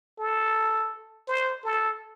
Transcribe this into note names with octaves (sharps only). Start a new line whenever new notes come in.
A4
C5
A4